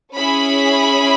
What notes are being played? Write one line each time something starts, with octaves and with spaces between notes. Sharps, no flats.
C#4 E4 G#4 B5